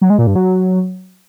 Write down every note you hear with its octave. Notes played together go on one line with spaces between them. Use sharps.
F#3
G#3
A#2
G2
F#3